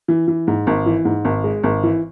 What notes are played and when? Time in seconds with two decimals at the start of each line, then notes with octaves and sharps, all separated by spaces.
0.08 E3
0.28 E3
0.48 G#2
0.67 G#1
0.86 E3
1.05 G#2
1.25 G#1
1.44 G#3
1.63 G#1
1.83 E3